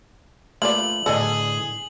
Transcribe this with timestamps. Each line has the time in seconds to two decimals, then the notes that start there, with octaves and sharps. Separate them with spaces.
0.62 A3 A#3 D4 F4 B4 D5 F#7
1.06 A2 D3 B3 G#4 A4 D5 D#5